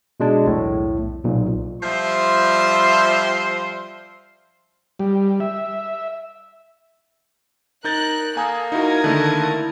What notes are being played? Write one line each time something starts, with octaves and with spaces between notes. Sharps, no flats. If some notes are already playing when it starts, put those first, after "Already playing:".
B2 G#3 D4
B1 E2 A2
B1 A#2
F3 G3 E5 C6
G3
E5
D#4 A#4 F#6 G6 A6
A#3 A4 G#5 A#5 D#6
D#4 E4 F#4 A#4 D#6 G#6
D3 D#3 A3 A#3 E4 A5